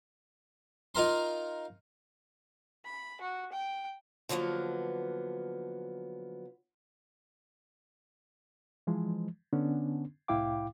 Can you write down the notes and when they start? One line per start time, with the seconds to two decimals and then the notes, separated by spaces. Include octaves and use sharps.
0.95 D#4 F4 A#4 C6
2.85 B5
3.21 F#4
3.52 G5
4.29 D3 F3 F#3 A#3 B3
8.87 E3 F3 G#3
9.53 D3 B3 C#4 D4
10.28 C2 A2 E4 F5 G5 D6